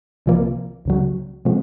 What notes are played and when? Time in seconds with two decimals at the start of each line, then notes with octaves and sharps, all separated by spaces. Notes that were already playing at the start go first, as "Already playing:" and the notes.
0.26 C2 C3 F3 A#3
0.85 C#2 C#3 F#3
1.45 C3 F3 G#3